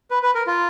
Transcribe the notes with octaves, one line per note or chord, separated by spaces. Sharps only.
B4
B4
A#4
F4